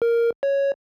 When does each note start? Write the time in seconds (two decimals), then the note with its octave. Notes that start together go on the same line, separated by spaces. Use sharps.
0.02 A#4
0.43 C#5